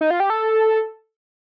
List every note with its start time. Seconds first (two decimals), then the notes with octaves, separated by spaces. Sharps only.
0.01 D#4
0.11 F4
0.20 G4
0.30 A4